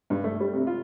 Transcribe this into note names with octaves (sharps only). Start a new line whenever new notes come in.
G2
A3
G3
C3
F4